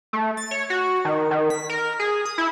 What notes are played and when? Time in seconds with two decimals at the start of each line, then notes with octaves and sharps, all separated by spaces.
0.13 A3
0.37 A6
0.51 C#5
0.70 F#4
1.05 D#3
1.31 D#3
1.50 B6
1.70 A#4
1.99 G#4
2.25 D#6
2.38 E4